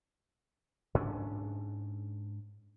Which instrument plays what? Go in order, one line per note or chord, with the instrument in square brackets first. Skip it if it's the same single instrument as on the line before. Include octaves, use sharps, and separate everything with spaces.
[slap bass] G#2 C#4 D4